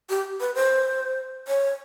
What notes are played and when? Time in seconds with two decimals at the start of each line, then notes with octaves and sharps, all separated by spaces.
0.10 G4
0.40 B4
0.55 C5
1.48 C#5